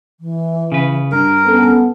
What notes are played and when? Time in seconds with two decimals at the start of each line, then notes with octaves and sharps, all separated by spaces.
0.20 E3
0.72 C#3 B4
1.12 G2 D4 A#4
1.46 B3 C#4 A4